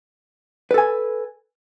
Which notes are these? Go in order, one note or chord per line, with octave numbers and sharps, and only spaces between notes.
A4 B4 G#5